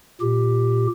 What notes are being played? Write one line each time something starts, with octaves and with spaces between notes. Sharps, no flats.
A#2 G4